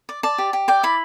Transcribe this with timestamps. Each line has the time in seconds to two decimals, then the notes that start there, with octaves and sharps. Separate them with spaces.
0.09 D5
0.23 D5 A5
0.38 G4
0.53 G4
0.68 D5 G5
0.83 E4 B5